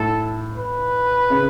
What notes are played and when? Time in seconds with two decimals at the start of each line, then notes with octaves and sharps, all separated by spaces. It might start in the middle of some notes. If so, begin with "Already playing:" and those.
Already playing: A2 A4
0.55 B4
1.30 C#3